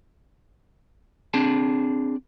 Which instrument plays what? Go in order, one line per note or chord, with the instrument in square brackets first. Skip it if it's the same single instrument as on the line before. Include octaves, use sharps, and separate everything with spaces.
[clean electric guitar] C4 D4 G#4 A5